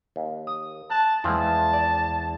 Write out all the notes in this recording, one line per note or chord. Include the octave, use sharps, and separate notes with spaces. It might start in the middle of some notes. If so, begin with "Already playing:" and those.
D#2
D#6
A5 F#6
E2 E3 F3 G#3 C4 A5
D5